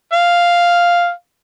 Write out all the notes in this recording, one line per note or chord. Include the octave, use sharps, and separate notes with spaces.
F5